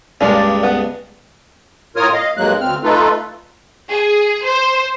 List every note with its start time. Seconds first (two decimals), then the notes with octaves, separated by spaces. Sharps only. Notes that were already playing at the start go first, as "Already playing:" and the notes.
0.21 C#2 G2 C#3 G#3 A#3 D4 D5
0.63 B3
1.96 A2 F4 A#4 C#5 D#6 F6
2.13 D#5 F5
2.37 G2 F#3 G#3 A#3 F#6
2.60 D2 C4 F6
2.83 A3 D#4 F4 A4 B4
3.91 G#4
4.45 C5